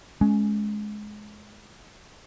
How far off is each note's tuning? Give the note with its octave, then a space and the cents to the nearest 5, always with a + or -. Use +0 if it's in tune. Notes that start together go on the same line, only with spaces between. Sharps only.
G#3 +20 C#4 +0